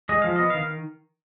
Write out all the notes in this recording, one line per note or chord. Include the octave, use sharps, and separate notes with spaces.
G#3 D#5
F3 F5
B3 D#5
D#3 F5